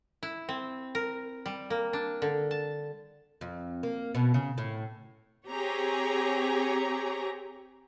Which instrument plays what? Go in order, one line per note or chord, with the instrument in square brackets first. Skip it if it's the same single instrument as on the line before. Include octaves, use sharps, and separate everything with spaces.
[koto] E4
C4
A#4
G3
A#3
D4
D3
A5
[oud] F2
A#3
B2
C#3
A2
[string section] C4 G4 G#4 C#5 A#5